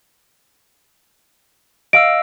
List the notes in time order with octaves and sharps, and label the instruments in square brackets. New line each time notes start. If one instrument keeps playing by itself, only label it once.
[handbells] D#5 F5 E6 [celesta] D7